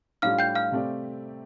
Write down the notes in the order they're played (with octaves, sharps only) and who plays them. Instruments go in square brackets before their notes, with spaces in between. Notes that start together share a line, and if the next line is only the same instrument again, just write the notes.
[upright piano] A2 G3 D4 F4 [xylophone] F5 F6
[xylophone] G5 G6
F5 F6
[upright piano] C3 A3 C4 G4 D5